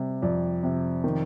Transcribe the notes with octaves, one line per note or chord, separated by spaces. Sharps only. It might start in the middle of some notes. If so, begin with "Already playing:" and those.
Already playing: C3 G3
F2 D5
C3
D#3